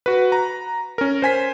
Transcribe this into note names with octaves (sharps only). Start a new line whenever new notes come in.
F#4 B4
A#5
C#4 A#4
C5 G#5 B6